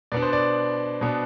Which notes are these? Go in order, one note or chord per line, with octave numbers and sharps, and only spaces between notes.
B2 B3 D4 D5
C5
D5
B2 B3 D4